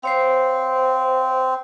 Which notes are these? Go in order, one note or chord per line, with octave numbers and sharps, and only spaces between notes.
C4 C5 C#5 F5